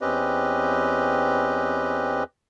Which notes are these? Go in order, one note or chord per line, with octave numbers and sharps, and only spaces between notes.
E2 C4 C#4 G4 B4 D#5